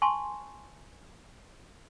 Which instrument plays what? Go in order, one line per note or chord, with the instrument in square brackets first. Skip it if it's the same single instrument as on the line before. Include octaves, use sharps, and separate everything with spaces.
[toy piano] G#5 A5 C6 C#6